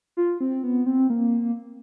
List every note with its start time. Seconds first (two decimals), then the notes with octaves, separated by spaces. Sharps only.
0.17 F4
0.41 C4
0.63 B3
0.86 C4
1.10 A#3